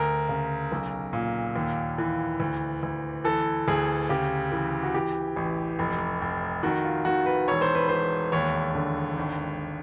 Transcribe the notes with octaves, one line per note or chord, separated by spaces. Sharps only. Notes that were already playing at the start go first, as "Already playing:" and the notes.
Already playing: D2 A#4
C#3
B1
A#2
D#2
E3
D2
D2
E3 A4
D2 G#4
C#3 G4
E3
F#4
E3 G4
A1
F1
F1
D#3 F#4
F4
D#3 F#4
B4
E1 C#5
C5
B4
E1 C5
D#2 C#5
D3
G#1